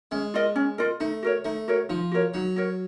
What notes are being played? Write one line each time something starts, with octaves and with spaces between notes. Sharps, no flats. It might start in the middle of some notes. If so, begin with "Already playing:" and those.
G#3 C#4
F4 A#4 D#5
C#4
F4 A#4 D#5
A3 D#4
F#4 A#4 C#5
A3 D#4
F#4 A#4 C#5
F3 D#4
F#4 A#4 C#5
F#3 D#4
F#4 A#4 C#5